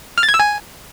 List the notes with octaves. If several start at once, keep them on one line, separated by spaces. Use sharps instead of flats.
F6
A6
G#6
E6
G#5